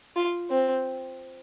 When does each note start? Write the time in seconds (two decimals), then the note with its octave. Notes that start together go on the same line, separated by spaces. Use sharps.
0.16 F4
0.50 C4